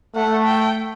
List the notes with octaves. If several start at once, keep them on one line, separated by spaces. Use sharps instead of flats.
A3 F#5
G5